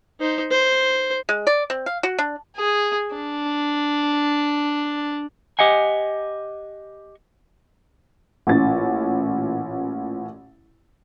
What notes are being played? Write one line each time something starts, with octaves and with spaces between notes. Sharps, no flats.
D#4 C5
C5
G#3
D5
C4
F5
F#4
D4
G#4
D4
G4 D#5 F#5 G#5
A1 A#2 C#4 A6